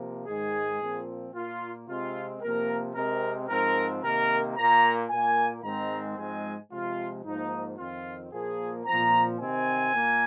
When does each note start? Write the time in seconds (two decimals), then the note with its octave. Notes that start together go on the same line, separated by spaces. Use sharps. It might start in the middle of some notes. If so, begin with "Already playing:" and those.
Already playing: C3 F3 A#3
0.27 G#2 D#3 G#3 G#4
0.80 A#2 F3 C4
1.34 A#2 A#3 F4
1.88 C3 G#3 C4 F4
2.42 C3 F3 A#3 A#4
2.95 C3 G#3 C4 A#4
3.49 G#2 F3 C4 A#4
4.03 C3 D#3 A#3 A#4
4.56 A#2 A#3 A#5
5.10 A#2 A#3 G#5
5.64 G#2 D#3 G#3 C4 A#5
6.17 G#2 F3 G#3 C4 G#5
6.71 C3 F3 G#3 F4
7.24 G#2 F3 A#3 D#4
7.78 F2 D#3 C4 F4
8.32 A#2 F3 A#3 G#4
8.86 A#2 F3 C4 A#5
9.39 C3 D#3 C4 G#5
9.93 A#2 A#3